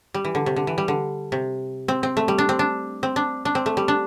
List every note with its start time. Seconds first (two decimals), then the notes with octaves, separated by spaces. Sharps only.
0.14 G3
0.25 E3
0.35 D3
0.46 C3
0.56 D3
0.67 E3
0.78 G3
0.88 D3
1.32 C3
1.88 C4
2.03 C4
2.17 A3
2.28 G3
2.38 D4
2.49 C4
2.59 D4
3.03 C4
3.16 D4
3.45 D4
3.55 C4
3.66 A3
3.77 G3
3.88 D4